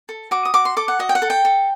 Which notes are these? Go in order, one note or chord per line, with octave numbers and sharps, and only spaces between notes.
A4
F#4 D6
D#6
F#4 D6
C6
A4 D6
F#5
F#4 D#5
G5
F#5
A4
G5
A4